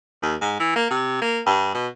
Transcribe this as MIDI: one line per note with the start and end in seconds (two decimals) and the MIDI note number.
0.22 0.35 39
0.41 0.56 44
0.60 0.74 52
0.76 0.85 58
0.90 1.18 48
1.22 1.40 58
1.46 1.74 43
1.74 1.87 47